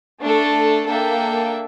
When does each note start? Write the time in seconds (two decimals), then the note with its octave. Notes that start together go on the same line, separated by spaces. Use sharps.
0.21 A3 D4 A4
0.87 A#3 D4 A4 E5 G5